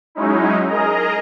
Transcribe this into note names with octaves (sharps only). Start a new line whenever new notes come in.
F#3 G#3 C#4 D#4 E4
G#4 A#4 D#5 A#5